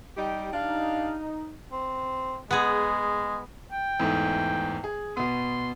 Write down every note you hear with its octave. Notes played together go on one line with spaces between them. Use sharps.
G3 D#4 G4
D4 D#4 G4 F5
C4
G#3 B3 G#4
G5
E2 G#2 A3
G#4
B2 B3 C6